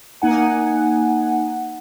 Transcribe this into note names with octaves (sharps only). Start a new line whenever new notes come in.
A#3 D#4 F#5 G#5